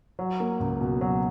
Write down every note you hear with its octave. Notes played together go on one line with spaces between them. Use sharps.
F#3
A#3
C#2
B2
F#3